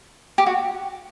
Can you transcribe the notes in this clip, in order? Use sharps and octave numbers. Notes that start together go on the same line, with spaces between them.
G4
F#4